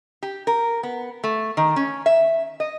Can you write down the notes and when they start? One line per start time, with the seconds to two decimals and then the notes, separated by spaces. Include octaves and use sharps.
0.23 G4
0.47 A#4
0.83 B3
1.24 A3
1.57 D#3
1.76 C#4
2.06 E5
2.60 D#5